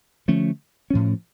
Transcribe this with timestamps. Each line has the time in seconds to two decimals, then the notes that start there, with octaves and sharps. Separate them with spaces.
0.28 D3 F3 A3 C#4
0.90 A2 F3 C#4